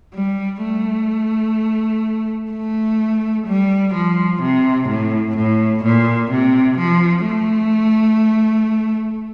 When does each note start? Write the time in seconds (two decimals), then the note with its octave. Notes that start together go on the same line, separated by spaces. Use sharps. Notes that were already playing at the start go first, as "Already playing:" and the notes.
0.14 G3
0.62 A3
2.52 A3
3.46 G3
3.94 F3
4.42 C3
4.88 A2
5.36 A2
5.84 A#2
6.31 C3
6.79 F3
7.26 A3